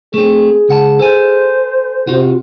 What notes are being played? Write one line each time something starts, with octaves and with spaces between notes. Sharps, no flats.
A3 C4 G#4
C#2 F#5 A5
A4 C5 G#5
C3 F4 F#4